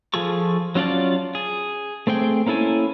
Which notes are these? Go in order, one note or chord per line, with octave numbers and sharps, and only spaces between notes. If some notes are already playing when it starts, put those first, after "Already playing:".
F3 F4 G#4 A4 C#6
F#3 C#4 F4 D5 A5
G#4
A3 C4 G#4 G5
A#3 C#4 E4 A4 G#5